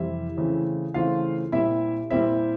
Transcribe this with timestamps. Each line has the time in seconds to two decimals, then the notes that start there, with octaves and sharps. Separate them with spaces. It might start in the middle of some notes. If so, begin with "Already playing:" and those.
Already playing: F2 C3 E3 G3 C4 E4 E5
0.37 C#3 E3 A3 C4
0.94 C#3 E3 A3 C4 F4 F5
1.52 A#2 G3 C4 E4 E5
2.10 A#2 G3 C4 E4 E5